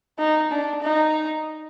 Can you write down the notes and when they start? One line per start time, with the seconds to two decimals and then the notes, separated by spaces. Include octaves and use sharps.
0.19 D#4
0.51 D4
0.83 D#4